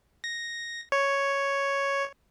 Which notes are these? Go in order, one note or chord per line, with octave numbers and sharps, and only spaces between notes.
A#6
C#5